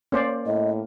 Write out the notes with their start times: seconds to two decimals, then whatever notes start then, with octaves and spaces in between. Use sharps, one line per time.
0.12 A#3 C#4 C5 D5
0.46 A2 D#5